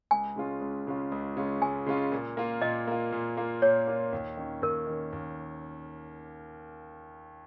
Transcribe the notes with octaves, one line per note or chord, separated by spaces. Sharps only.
C#2 G#5
C#3 G#3 C#4 F4
C#2
C#3 G#3 C#4 F4
C#2
C#3 G#3 C#4 F4
C#2 G#5
C#3 G#3 C#4 F4
A#2
A#3 F4
A#2 D#5
A#3 F4
A#2
A#3 F4
A#2 C#5
A#3 F4
D#2
D#3 C#4
D#2 A#4
D#3 C#4
D#2